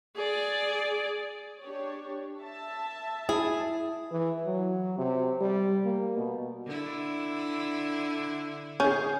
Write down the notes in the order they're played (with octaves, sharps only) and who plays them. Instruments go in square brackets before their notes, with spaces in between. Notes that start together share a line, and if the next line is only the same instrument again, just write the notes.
[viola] G#4 D5
[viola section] D4 G4 C#5
E5 A5
[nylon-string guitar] E4 [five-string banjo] G#4
[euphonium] E3
F#3
C3
G3
A#3
B2
[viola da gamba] D3 E4
[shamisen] C#4 [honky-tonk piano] G#4 G6